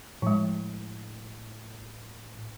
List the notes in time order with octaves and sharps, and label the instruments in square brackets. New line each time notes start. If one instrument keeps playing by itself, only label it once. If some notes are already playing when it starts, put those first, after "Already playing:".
[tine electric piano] A2 [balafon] F3 G#3